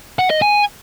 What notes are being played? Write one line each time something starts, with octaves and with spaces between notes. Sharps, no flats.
F#5
D#5
G#5